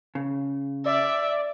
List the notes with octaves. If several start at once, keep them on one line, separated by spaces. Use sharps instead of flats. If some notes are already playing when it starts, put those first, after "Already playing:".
C#3
D5 E5